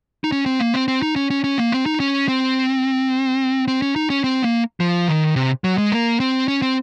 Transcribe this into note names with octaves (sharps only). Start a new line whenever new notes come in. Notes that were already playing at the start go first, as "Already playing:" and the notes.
D#4
C#4
C4
A#3
C4
C4
D#4
C#4
C#4
C#4
A#3
C4
D#4
C#4
C4
C4
C#4
D#4
C#4
C4
A#3
F3
D#3
C3
F#3
G#3
A#3
C4
C#4
C4